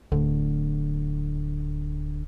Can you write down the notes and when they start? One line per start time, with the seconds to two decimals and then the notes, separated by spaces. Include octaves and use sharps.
0.12 D1 D3